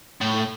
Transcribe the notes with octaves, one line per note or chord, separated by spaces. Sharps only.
A2